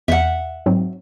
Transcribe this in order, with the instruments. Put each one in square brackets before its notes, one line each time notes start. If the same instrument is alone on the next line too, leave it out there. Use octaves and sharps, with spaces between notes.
[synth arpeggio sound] E2 [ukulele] E5 F#5
[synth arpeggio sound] G#2 F#3 C4